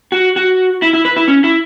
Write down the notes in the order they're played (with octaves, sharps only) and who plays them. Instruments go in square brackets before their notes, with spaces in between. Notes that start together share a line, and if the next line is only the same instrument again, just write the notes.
[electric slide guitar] F#4
F#4
E4
E4
B4
E4
C#4
E4